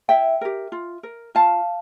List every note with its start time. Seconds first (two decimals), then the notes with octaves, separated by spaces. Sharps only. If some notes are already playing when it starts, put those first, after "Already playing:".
0.09 E4 E5 G5
0.41 G4 A#4
0.72 F4
1.03 A#4
1.35 F4 F5 A5